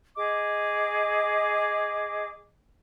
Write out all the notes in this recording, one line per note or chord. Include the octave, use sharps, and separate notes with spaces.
G#4 D#5 D6